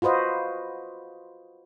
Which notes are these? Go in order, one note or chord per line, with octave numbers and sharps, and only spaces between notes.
F4 F#4 B4 C5 D#5